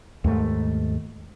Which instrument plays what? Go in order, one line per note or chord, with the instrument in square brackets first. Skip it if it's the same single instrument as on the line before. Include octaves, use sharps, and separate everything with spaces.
[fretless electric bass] D#2 G#2 A3